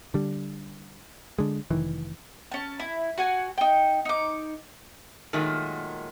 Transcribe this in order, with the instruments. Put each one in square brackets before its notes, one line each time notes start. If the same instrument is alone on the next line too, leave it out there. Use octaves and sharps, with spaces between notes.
[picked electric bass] D3 G3
D3 G#3
F1 D#3 E3
[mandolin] C#4 A5
E4
F#4 F#5 G#5
D#4 G5
D#4 D6
[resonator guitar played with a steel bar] A#2 D#3 F#3 G#3 A3